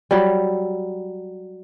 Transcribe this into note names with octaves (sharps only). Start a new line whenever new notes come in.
F#3 G3